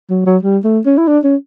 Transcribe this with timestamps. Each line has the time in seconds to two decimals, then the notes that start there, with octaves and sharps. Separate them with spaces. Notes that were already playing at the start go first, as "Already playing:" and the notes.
0.10 F#3
0.26 F#3
0.43 G3
0.64 A3
0.86 C#4
0.98 E4
1.07 D4
1.24 C#4